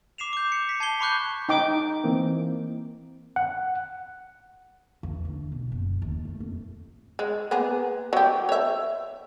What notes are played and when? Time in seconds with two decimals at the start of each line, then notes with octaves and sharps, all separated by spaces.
0.18 D6 C7 E7 F7
0.33 D6 G6
0.52 C#7
0.69 B6
0.80 A5 G#6 C7 C#7 G7
1.00 A5 B5 C#6 D6 F#6 G6
1.49 D#4 G5 D6
2.04 E3 A#3 C4
3.36 F#5
5.03 E2
5.25 D3
5.52 B2
5.72 F#1
6.02 D#2
6.25 A3
6.40 F2
7.19 G#3
7.51 A#3 B3 G#4
8.13 F#3 G4
8.49 C#5 E5